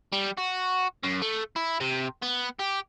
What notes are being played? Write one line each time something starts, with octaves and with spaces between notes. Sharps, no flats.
G3
F#4
F#2
A3
E4
C3
B3
G4